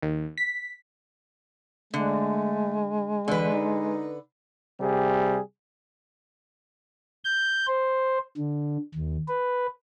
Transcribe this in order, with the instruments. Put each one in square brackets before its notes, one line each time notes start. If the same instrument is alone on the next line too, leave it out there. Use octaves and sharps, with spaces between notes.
[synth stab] D#2
B6
[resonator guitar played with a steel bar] D3 [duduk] G#3 [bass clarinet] A3
[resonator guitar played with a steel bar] D3 B4 [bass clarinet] E3
[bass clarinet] D#4
[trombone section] C3 G3 G#4
[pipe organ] G6
C5
D3
D#2
B4